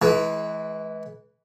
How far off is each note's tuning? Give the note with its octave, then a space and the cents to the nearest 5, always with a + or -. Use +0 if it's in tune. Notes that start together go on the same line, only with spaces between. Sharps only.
E3 -10 G#3 +35